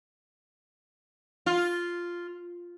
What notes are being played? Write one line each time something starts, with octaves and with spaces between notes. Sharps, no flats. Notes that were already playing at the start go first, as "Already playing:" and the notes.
F4